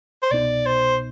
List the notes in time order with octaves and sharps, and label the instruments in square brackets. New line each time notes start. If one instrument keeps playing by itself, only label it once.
[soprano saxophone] C5
[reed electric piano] C2 B2 B3 D#4 [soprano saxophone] D5
[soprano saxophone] C5